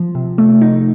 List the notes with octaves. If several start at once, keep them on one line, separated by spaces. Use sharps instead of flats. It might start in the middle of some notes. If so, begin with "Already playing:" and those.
Already playing: F3
C3
A3
D#4